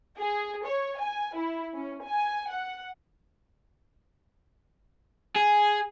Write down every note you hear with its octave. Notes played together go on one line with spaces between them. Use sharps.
G#4
C#5
G#5
E4
C#4
G#5
F#5
G#4